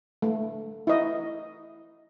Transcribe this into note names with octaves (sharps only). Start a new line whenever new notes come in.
A3
E4 D#5